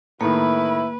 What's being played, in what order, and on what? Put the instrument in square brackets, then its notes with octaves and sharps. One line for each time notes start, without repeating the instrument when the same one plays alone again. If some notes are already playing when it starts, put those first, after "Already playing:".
[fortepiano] A2 D#3 [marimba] A#3 [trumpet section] E4 [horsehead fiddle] B4